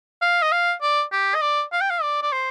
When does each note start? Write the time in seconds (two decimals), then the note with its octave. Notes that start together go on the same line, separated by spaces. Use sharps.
0.22 F5
0.42 D#5
0.52 F5
0.82 D5
1.12 G4
1.35 D#5
1.42 D5
1.72 F5
1.81 G5
1.90 F5
2.02 D5
2.22 D5
2.32 C5